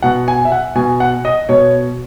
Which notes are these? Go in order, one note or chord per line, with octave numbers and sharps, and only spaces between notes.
B2 F#5
G#5
E5
F#5
B2 G#5
F#5
D#5
B2 C#5